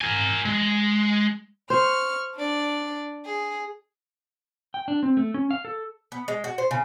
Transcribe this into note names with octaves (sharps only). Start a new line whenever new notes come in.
A#4 G#5
G#3
C5 C#6 F6
D4 D5
G#4
G5
D4
C4
A3
C#4
F5
A4
B3
G#3
F#4
C5
C#3